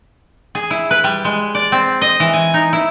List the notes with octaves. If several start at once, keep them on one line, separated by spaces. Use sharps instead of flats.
G#4
E4
B4
G3
G#3
D5
C4
D#5
E3
G#5
D#4
E4